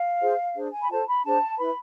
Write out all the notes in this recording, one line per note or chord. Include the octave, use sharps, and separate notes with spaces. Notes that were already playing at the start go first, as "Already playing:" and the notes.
Already playing: F5
F4 G#4 C5
D4 G#4 C5
G#5
B5
F4 A4 C5 A5
B5
D4 G#4 C5 A5
E4 B4 B5